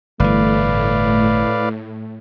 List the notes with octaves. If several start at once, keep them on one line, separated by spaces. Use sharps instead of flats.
G1 A2 E3 A3 B4 D5 F5